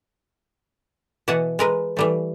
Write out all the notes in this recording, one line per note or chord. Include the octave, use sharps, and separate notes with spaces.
B2 E3 E5 F#5 G#5 A5
G#3 A#4 B4
E3 G3 A3